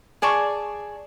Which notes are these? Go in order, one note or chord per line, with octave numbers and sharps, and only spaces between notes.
G#4 D5 A5 C#6